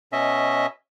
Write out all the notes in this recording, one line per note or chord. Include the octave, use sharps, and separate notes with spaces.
B2 C#4 D#5 E5